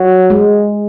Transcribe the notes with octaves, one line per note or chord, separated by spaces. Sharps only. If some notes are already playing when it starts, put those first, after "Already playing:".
Already playing: F#3
G#3